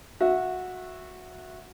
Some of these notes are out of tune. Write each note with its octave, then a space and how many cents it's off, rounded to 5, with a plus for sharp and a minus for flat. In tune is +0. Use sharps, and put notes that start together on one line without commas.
F#4 -15 E5 +0